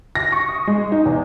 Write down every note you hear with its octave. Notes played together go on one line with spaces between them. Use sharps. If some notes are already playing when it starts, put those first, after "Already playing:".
A#6
C#6
D#6
G#3
D#4
E2